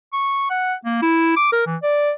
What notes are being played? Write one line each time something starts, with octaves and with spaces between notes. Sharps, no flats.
C#6
F#5
A#3
E4
D6
A#4
E3
D5